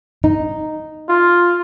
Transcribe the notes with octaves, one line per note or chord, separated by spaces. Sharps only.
D#4
F4